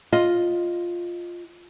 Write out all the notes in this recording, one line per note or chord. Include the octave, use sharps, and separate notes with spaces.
F4 D#5